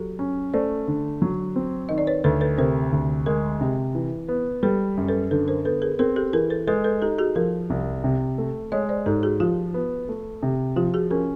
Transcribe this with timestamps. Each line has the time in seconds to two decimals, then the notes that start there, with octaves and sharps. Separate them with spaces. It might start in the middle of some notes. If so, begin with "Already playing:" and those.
Already playing: F#3 G4 A4
0.19 C#4
0.54 A3 C5 D5
0.87 D3
1.22 F#3
1.56 C4
1.89 D#3 D#5
1.98 D5
2.07 B4 C#5
2.24 D2 A4 B4
2.41 A4 B4
2.58 C3 A#4 C5
2.92 D2
3.26 G#3 G#4 A#4
3.61 C3
3.95 E3
4.28 B3
4.63 G3 A4 B4
4.97 F#2
5.08 A4 B4
5.31 D3 A4 B4
5.48 A#4 C5
5.65 B3 A4 B4
5.82 G#4 A#4
5.99 C4 G#4 A#4
6.16 G4 A4
6.33 E3 G#4 A#4
6.50 A4 B4
6.67 G#3 A4 B4
6.84 A4 B4
7.02 D#4 G4 A4
7.18 F#4 G#4
7.35 F3 G#4 A#4
7.70 C2
8.04 C3
8.38 A3
8.72 G#3 C#5 D#5
8.89 C5 D5
9.06 G#2 G4 A4
9.23 F#4 G#4
9.40 F3 F4 G4
9.74 B3
10.09 A3
10.43 C3
10.76 F3 F4 G4
10.94 F#4 G#4
11.11 C#4 G#4 A#4